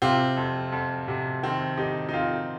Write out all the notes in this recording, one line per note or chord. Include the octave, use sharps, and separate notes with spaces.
C3 C4 F4
F2
F2
C3
D#3 C4
D#3 D#4 G4
D#4
F2 C4 F4